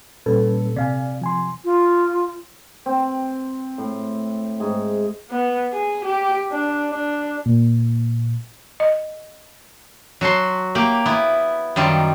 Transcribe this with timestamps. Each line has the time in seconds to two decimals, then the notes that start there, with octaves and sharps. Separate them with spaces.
0.26 A#2 G3 C#4 A4 B4
0.76 C3 D5 F5 G#5
1.21 F3 G#5 C6
1.64 F4
2.86 C4
3.78 A2
4.60 G#2
5.30 B3
5.73 G#4
6.05 G4
6.51 D4
6.89 D4
7.46 A#2
8.80 D#5
10.21 F#3 F#4 A5 C6
10.75 A#3 G4
11.05 B3 E4
11.76 F#2 D#3 G3 F4